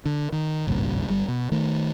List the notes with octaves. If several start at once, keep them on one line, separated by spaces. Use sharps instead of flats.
D3
D#3
G#1 C#2 G2 A#2
G1 G2 G3
B2
D#3 A3